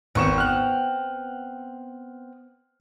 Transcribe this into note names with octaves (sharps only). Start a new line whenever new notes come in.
G#1 B3 C4 C#6 E7
F6 F#6